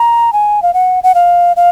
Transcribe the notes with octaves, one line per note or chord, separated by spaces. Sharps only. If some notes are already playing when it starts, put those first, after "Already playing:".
Already playing: A#5
G#5
F5
F#5
F#5
F5
F5